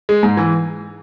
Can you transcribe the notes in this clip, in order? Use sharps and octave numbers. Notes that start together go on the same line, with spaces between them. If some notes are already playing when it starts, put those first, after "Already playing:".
G#3
G#2
E3